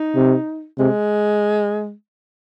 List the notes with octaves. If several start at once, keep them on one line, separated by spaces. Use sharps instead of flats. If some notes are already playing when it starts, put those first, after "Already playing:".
Already playing: D#4
C3
C3 G#3